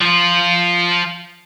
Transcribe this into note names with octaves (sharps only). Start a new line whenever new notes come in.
F3 F4